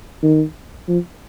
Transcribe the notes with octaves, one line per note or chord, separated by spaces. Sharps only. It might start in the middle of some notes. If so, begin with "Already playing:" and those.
D#3
F3